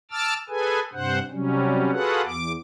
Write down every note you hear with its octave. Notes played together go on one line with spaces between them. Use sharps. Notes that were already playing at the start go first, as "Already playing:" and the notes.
A5 D6 E6 F6 A6
G#4 A4 B4 G#5
G2 C3 C5 F#5
C3 F#3 G3 C#4
F4 F#4 G#4 A4 B4 F#5
E2 D6